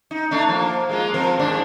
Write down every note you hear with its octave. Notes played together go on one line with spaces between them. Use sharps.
D#4
A3 D4 D#4
F3 A#3
G#3 A#3 F4
F3 C4 A#4
D#2 G#2 D4